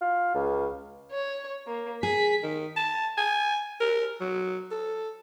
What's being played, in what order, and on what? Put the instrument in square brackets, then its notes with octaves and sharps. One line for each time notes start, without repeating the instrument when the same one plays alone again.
[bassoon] F4
C#2
[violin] C#5
A#3
[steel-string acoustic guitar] G#4 [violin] B6
[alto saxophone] D#3
A5
G#5
A#4
F#3
A4